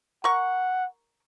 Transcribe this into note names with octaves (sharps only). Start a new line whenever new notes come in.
A#4 F#5 C#6